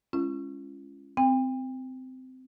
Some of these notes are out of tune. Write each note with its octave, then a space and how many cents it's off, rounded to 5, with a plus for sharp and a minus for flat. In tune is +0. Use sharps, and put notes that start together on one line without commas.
G#3 -5 C#4 +0 F4 -40
C4 -20 G5 +35